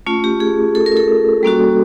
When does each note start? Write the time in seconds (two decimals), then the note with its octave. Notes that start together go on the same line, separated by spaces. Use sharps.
0.07 A3 C#4 F4
0.24 G4
0.40 G#4
0.75 A4
0.86 A#4
0.97 A4
1.43 G3 A#3 C#4 F#4